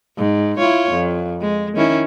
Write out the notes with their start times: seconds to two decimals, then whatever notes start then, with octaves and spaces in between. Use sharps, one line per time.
0.18 G#2
0.57 E4 F4 C#5
0.91 F2
1.41 G#3
1.76 D#3 C#4 E4